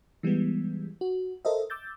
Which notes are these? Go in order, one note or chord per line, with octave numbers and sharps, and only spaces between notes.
E3 G3 G#3 B3
F#4
A4 A#4 C5 D#5 E5
D6 E6 G6 A6